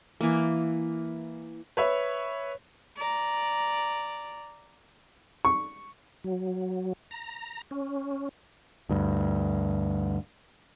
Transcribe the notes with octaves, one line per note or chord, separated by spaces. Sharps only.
E3 A#3
B4 C#5 E5
D5 A#5
C#6
F#3
A#5
C#4
D2 G2